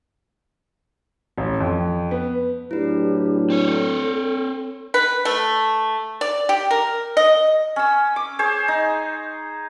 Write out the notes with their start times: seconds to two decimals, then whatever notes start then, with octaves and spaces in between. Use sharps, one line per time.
1.38 A1
1.60 F2
2.11 B3
2.71 A2 F#3 D4 E4 G4 B4
3.50 C4 A4 C#5
4.94 B4
5.25 A3
6.21 D5
6.49 G4
6.71 A#4
7.17 D#5
7.76 C#4 E6
8.16 D6
8.39 G#4 C5 C#5
8.68 D#4